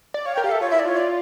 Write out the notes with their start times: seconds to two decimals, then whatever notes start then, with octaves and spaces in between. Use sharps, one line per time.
0.14 D5
0.26 C#5 F5
0.35 A#4 G5
0.44 G4 F5
0.49 A4 E5
0.61 F4 C#5
0.70 E4 E5
0.79 D5
0.85 F4 C#5
0.97 D5